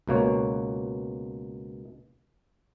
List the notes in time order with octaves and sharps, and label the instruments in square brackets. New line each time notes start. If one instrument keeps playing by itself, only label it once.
[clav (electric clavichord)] C#2 B2 A#3 C#5